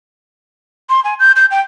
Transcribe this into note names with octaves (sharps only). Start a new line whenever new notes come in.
C6
G#5
G6
G6
G5